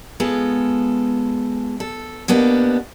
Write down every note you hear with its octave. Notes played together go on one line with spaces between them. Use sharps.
G#3 B3 F4 A4
A4
B2 A#3 B3 D4 G4